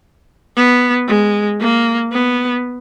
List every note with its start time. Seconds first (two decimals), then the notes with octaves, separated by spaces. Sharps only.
0.56 B3
1.08 G#3
1.60 A#3
2.13 B3